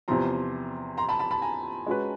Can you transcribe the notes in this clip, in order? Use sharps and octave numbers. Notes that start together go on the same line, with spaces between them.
E2 C3 F3 A#5 C6
A#5 C6
A5 B5
A5 B5
A5 B5
G#5 A#5
G#3 C#4 F#4 B4